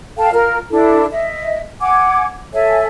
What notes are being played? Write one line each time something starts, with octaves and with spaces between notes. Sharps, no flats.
A4 F5 G5 A5
F4 A#4 F6
D4 E4 A4
D#5 E5
F#5 G#5 D6 G#6
A4 C#5 E5 G#5